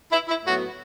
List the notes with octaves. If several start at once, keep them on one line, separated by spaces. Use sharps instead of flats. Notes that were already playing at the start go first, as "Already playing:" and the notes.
E4
E4
A2 F#3 B3 F#4